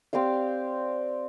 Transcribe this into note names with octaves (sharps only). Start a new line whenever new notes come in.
C4 G4 D5 F5